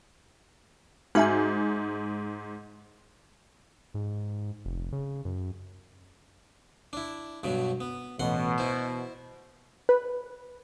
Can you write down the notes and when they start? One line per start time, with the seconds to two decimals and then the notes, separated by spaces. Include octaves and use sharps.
1.15 G#2 D#4 F#4 E5 G#5
3.94 G#2
4.65 F1
4.92 C#3
5.25 F#2
6.93 D4 E4
7.43 G2 B2 F#3
7.81 B3
8.20 A1 B2 F#5 C6
8.58 E4 C5
9.89 B4